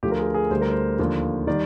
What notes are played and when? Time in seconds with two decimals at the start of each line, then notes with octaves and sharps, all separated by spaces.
0.03 D2 D3 F3 G4
0.11 A#4
0.19 G#4
0.34 G#4
0.50 D2 D3 G3 C5
0.61 A#4
0.72 C5
0.99 D#2 D3 F3
1.47 D#3 G3 D5